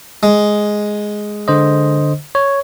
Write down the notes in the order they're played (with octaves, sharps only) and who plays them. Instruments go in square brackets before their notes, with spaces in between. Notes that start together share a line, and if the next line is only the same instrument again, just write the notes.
[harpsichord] G#3
[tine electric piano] D3 C5 D#5
C#5